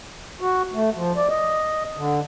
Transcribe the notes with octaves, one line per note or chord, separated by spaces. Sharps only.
F#4
A3
F3
D5
D#5
D3